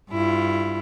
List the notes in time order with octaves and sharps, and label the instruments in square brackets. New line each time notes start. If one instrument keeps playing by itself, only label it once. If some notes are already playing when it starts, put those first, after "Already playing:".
[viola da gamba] G2 E4 F4